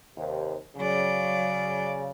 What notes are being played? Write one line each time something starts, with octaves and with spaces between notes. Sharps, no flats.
D#2 C3
C#3 F#3 D5